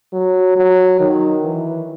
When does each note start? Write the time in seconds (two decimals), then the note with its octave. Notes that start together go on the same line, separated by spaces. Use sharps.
0.13 F#3
0.57 F#3
1.00 D#3
1.44 E3